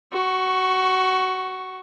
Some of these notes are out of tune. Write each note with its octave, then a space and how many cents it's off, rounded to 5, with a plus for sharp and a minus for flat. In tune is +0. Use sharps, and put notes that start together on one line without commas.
F#4 +20 C#6 +0